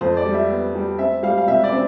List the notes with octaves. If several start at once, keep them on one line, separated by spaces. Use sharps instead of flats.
F2 C5
D5
G3
E5
B3
G3
C4 E5
G3 F5
F5
C3 E5
D5
C4